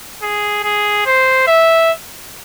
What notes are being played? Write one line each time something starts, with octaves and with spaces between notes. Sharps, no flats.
G#4
G#4
C5
E5